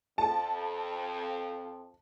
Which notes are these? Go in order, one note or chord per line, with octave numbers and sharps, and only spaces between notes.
F2 A5